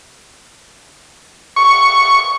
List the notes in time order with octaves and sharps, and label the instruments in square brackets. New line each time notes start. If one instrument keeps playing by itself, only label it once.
[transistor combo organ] C#6